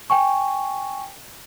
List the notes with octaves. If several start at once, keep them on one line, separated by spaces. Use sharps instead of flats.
G5 G#5 C#6